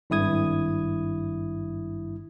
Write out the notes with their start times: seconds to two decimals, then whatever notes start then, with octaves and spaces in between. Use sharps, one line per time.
0.10 G#1 G2 E4 D#6 G#6